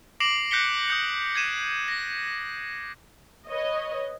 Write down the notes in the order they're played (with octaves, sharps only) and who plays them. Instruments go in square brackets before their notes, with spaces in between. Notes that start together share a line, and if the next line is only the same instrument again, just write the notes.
[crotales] D6 A#6 C7 D7 E7 F#7
F#6 G6 A#6 B6 C#7 G7
D#6 G6 C#7
G#6 C7 D#7 E7
A#6
[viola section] B4 C#5 D#5